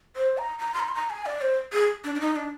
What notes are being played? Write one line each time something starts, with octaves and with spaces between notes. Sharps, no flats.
C5
A#5
A#5
C6
A#5
C6
A#5
G#5
D5
C5
G#4
D4
D4
D#4
D4